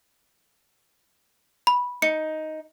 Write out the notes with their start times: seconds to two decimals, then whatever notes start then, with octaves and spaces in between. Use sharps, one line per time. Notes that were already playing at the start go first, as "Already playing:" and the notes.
1.67 B5
2.02 D#4 C#7